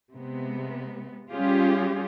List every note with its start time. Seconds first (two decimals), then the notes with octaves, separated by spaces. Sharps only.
0.14 C3 G#3 B3
1.31 G3 C#4 F4 G4 G#4